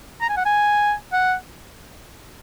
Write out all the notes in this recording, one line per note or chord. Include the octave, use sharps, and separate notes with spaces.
A#5
G#5
F#5
G#5
F#5